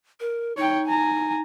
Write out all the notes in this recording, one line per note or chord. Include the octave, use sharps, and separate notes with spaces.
A#4
D#4 C#5 G5
G#5 A#5